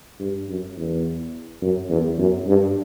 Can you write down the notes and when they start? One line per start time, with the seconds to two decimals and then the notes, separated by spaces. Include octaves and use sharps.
0.20 G2
0.48 F#2
0.77 E2
1.62 F#2
1.90 E2
2.18 F#2
2.47 G2